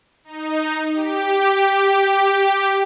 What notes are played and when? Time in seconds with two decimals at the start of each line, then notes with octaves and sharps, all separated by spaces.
0.24 D#4
0.94 G4